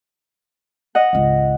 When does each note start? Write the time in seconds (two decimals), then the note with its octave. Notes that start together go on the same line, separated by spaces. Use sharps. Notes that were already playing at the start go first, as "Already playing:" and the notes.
0.95 D#5 F#5
1.13 G#1 C#2